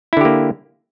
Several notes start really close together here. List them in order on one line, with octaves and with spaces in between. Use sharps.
E4 D3 G4 A#3